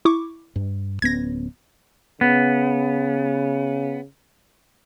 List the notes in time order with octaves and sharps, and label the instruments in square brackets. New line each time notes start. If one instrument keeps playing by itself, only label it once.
[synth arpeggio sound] E4 C#6 D6
[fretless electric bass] G2
[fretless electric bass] D1 B3 C#4 [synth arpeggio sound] G#6 A#6
[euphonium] C#3 [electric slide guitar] B3